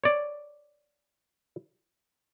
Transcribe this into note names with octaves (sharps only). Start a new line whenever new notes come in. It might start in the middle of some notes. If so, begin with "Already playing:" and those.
C#5 D5